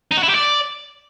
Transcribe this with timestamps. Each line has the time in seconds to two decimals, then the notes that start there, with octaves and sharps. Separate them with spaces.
0.11 D#4
0.17 F#4
0.23 E4
0.29 G4
0.35 D5